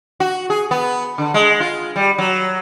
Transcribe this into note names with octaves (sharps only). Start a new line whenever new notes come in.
F#4
G#4
B3
D3
G#3
F4
G3
F#3